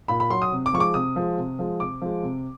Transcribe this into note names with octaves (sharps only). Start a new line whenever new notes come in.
A#2 B5
B5
F#3 C6
D#6
C3
D6
F3 G#3 C#6 D6
C3 D#6
F3 G#3
C3
F3 G#3
C3 D6
F3 G#3
C3